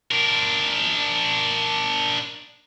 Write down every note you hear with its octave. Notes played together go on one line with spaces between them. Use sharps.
D4 A#4